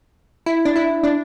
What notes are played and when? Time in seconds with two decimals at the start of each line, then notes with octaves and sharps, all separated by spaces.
0.46 E4
0.65 D4
0.76 E4
1.03 D4